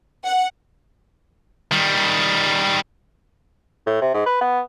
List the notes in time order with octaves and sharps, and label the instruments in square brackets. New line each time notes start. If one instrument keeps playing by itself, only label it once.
[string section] F#5
[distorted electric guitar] D#3 G3
[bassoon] A2
C3
G#2
B4
B3